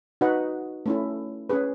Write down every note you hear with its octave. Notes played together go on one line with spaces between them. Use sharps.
D#4 F#4 B4 D#5 F#5
A3 C#4 E4
C#4 G#4 B4